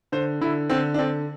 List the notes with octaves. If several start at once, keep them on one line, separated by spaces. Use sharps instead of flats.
D3 C5
D3 E4
D3 C4
D4
D3 C4